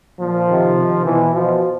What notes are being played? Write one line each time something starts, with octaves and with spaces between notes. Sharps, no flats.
A#2 F3
C3 D#3
C3 D#3
B2 E3
B2 F3